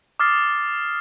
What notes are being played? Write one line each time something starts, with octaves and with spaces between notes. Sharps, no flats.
D6 D#6 F6 A6 C7